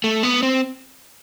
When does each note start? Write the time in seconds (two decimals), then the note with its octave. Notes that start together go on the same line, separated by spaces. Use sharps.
0.04 A3
0.23 B3
0.43 C4